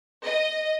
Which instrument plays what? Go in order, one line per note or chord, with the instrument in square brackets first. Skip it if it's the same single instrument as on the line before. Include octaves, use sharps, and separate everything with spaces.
[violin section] D#5